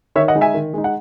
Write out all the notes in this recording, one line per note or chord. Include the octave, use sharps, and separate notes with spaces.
D#3 C#5 E5
D#5 F#5
G#3 D#4
E5 G#5
D#3
G#3 D#4
F#5